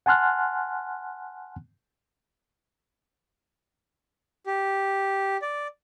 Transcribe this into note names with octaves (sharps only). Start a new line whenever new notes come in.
F#5 G#5 A5 C6 F6 F#6
G4
D5